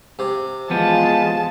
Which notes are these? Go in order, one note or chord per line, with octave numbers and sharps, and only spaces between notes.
C3
E2 F3 G#3 B3 F4 A5